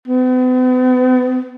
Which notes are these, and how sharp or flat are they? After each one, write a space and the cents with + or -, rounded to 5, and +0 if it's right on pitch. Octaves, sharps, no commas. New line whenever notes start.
B3 +45